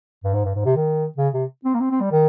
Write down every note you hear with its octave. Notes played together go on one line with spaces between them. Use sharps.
G2
G#2
G2
G#2
C3
D#3
C#3
C3
C4
A#3
C4
C4
G3
D#3